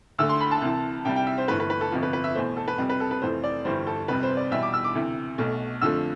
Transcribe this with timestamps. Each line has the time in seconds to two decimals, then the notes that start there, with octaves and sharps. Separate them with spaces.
0.18 D2 D3 A3 E6
0.29 C6
0.40 B5
0.51 A5
0.62 C2 C3 E3
1.05 C2 C3 G3 G5
1.16 G5
1.27 E5
1.38 C5
1.48 G1 G2 E3 A3 B4
1.60 B4
1.70 B4
1.81 A4
1.92 G1 F2 C3 F3
2.03 B4
2.13 B4
2.24 E5
2.35 E2 B2 A3 C5
2.57 A4
2.68 B4
2.78 F2 C3 G3
2.89 B4
3.00 A4
3.11 B4
3.21 F1 F2 E3 A3 C5
3.44 D5
3.65 G1 G2 E3 G3 C5
3.87 A4
4.08 F1 F2 C3 G3 B4
4.23 C5
4.37 D5
4.51 E2 B2 G3 E5
4.63 D6
4.73 E6
4.84 D6
4.95 D2 C3 E3
5.38 B1 B2 A3
5.81 F2 D3 F3 A3 E6